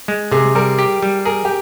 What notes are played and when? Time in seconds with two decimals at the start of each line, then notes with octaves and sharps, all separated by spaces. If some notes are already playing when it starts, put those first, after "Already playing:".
0.08 G#3
0.32 C3 G#4
0.55 G3 A#4
0.79 G4
1.02 G3
1.25 G#4 A#4
1.45 G4